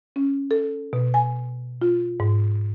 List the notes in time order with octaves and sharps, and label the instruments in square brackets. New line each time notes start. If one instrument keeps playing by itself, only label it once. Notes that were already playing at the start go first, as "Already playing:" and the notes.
[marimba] C#4
A4
B2
G#5
F4
G#2